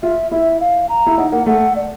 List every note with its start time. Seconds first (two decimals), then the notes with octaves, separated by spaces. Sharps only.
0.02 F4 E5
0.31 E4 E5
0.60 F5
0.89 A#5
1.07 E4
1.18 D#4 F#5
1.32 A#3 F#5
1.46 A3 F#5
1.76 D5